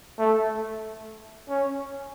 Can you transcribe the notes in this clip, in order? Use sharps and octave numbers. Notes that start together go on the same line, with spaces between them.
A3
C#4